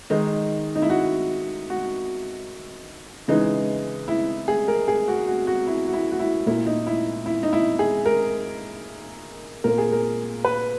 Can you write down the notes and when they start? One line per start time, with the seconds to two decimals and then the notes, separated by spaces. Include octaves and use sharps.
0.10 D#3 G#3 D#4
0.75 D#4
0.82 E4
0.90 F#4
1.70 F#4
3.28 C#3 E3 G#3 D#4
4.08 E4
4.48 G#4
4.68 A#4
4.88 G#4
5.08 F#4
5.27 F#4
5.47 F#4
5.67 E4
5.88 F#4
5.93 E4
6.12 F#4
6.20 E4
6.46 A#2 A#3 E4
6.66 D#4
6.87 E4
7.26 E4
7.43 D#4
7.53 E4
7.79 G#4
8.06 A#4
9.64 A#2 A#3 A#4
9.78 G#4
9.92 A#4
10.45 B4